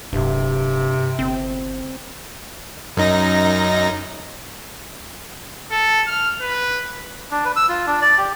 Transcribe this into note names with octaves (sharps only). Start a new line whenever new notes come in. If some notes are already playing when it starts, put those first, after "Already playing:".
D1 G2 C3
G1 C4
F#2 D#4 A#6
A4
F6
B4
D4
B4
E6
F4
D4
D5
G4